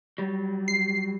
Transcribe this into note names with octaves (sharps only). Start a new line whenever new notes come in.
F#3 G3
C7